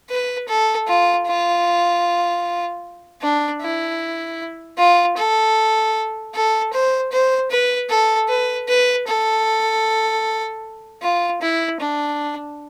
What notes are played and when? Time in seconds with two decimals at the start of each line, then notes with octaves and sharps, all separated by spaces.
0.10 B4
0.49 A4
0.88 F4
1.27 F4
3.22 D4
3.61 E4
4.78 F4
5.17 A4
6.35 A4
6.73 C5
7.12 C5
7.51 B4
7.90 A4
8.29 B4
8.68 B4
9.07 A4
11.03 F4
11.41 E4
11.81 D4